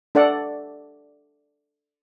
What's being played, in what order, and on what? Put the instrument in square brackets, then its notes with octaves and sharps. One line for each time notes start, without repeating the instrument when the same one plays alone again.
[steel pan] D4 A4 D5 F#5